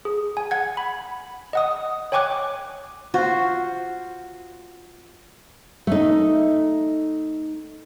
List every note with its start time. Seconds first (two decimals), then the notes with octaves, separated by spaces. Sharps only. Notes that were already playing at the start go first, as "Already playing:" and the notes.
0.05 G#4
0.37 G#5
0.51 F#5 G#6
0.77 B5
1.53 D#5 F#5 D#6
2.12 C#5 G5 G#5 C#6 D6 F#6
3.14 F4 F#4 C5
5.87 A3 D#4